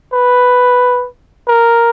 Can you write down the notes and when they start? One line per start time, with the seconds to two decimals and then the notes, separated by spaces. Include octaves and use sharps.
0.13 B4
1.48 A#4